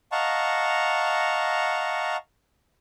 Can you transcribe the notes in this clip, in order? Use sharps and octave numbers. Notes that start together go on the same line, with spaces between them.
D#5 F5 F#5 A5 A#5 C#6